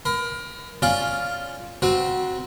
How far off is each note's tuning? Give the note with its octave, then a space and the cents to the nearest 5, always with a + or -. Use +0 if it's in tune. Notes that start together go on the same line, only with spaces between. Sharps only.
A#4 +25 B5 +30
C#4 +0 F4 +0 D5 +0
C4 +0 F#4 +0 B4 -45